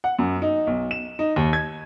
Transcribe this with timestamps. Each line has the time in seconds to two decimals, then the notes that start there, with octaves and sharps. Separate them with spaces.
0.04 F#5
0.19 F#2
0.42 D#4
0.67 B1
0.91 E7
1.19 D#4
1.36 D#2
1.53 G#6